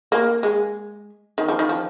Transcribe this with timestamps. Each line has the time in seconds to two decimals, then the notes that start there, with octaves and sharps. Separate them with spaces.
0.12 A#3
0.43 G#3
1.38 D#3
1.48 F3
1.59 D#3
1.69 F3